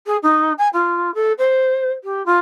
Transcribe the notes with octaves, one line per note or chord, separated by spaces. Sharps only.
G#4
D#4
G#5
F4
A4
C5
G4
F4